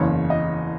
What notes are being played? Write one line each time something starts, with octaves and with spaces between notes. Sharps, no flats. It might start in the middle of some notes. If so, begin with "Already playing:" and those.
Already playing: F#1 E2 C#3 C#5
D#5